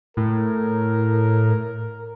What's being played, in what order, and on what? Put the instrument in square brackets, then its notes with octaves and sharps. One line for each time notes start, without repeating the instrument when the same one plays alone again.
[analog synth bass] A2 [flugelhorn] A#4